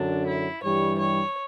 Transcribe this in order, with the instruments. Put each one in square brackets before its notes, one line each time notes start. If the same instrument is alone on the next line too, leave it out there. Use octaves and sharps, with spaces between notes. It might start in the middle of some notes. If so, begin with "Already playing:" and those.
Already playing: [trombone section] F#2 D3 F#3 [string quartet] D4
[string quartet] E4
[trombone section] G2 E3 G3 [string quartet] C#5
[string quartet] C#5